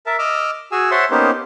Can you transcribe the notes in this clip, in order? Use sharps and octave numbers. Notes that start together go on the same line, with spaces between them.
A#4 E5 A5
D#5 D6 E6 F6
F#4 G#4 G#5 E6
C5 C#5 E5 F#5 A5 C6
A#3 B3 C#4 D#4 G4 C5